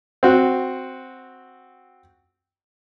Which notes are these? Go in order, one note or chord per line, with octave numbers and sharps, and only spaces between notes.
C4 F#4